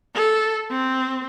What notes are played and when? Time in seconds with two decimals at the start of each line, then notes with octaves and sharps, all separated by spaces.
0.15 A4
0.71 C4